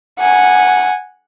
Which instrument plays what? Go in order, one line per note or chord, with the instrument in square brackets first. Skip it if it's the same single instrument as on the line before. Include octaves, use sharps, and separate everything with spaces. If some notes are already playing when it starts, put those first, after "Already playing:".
[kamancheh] F#5 G#5